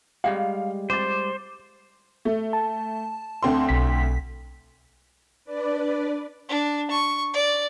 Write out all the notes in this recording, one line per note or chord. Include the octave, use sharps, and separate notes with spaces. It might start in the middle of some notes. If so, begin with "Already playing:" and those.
G3 G#3 G4 F5
C5 D6 A6
A3
A5
D2 C4 C6
B1 B6
D4 B4 D5
D4
C#6
D5